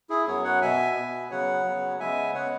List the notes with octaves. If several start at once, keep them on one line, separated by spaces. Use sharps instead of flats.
E4 G#4
F#2 F#3 B3 G#4 C#5
C#5 F#5
B2 B3 E5 G#5
B2 B3
C#3 F#3 B3 C#5 F#5
C#3 F#3 B3
C#3 G#3 B3 E5 G#5
C#3 G#3 B3 C#5 F#5